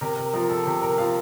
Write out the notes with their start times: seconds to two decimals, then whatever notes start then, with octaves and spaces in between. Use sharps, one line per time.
0.01 C3 A#4
0.17 A#4
0.33 F3 A#4
0.50 A4
0.66 C3
0.82 A#4
0.98 F3 F5